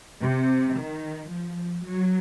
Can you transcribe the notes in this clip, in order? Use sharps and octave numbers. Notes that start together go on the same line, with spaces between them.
C3
D#3
F3
F#3